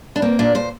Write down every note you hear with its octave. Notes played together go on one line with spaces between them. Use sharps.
D4
A#3 C4
A#2 D4
A#2 C5